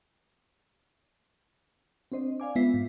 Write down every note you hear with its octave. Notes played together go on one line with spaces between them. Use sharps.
C4 D4 C5 D#5
D5 F5 G#5 D6
G#3 B3 F4 E5 B6 C7
G#2